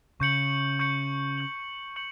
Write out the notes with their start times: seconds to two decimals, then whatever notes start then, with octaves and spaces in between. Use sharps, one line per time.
0.20 C#3 C#6 G6 C#7 F#7
0.79 C#6 G6 C#7 F#7
1.38 C#6 G6 C#7 F#7
1.96 C#6 G6 C#7 F#7